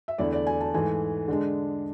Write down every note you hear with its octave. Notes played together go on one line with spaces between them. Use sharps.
E5
E2 D3 A3 E4 D5
D5
G#5
A5
G#2 E3 A3 G#5
D3 G#3 D4